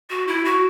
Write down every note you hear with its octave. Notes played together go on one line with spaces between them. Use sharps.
F#4
E4
F#4